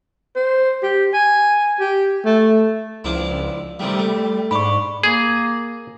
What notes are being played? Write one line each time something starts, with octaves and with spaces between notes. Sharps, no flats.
C5
G4
G#5
G4
A3
C#2 F3 D4 E4
C3 D#3 G3 A3
A3
G#2 D4 B5 C#6
A#3 G#4